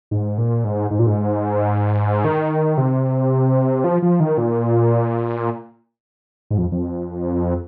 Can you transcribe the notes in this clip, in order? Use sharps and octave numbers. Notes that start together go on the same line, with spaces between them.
G#2
A#2
G#2
G#2
A#2
G#2
D#3
C3
F3
F3
D#3
A#2
G#2
F2
F2